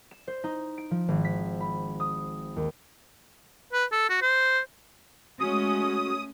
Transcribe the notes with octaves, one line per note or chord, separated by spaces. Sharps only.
E7
C5
D#4
D7
F3
G#1
B6
B5
D#6
D#2
B4
A4
F#4
C5
G#3 A3 C#4 F#4 D#6